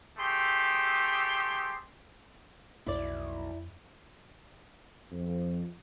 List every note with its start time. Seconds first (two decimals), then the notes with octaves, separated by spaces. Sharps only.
0.18 A3 C4 G4 G#4 C6
2.86 B1 F2 E4 D5
5.11 F2